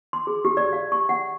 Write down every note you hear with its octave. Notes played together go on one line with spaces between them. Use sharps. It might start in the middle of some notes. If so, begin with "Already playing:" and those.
C6
G#4
G4
D5
F5
C#6
F#5